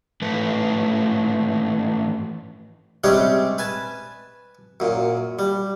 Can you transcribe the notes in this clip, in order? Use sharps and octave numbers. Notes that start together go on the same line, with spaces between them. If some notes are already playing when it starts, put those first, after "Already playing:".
G#2 E3 A3 B4
C3 G3 G#3 C#4 D4 G4
B4 G#5 A5
F#2 A#2
G3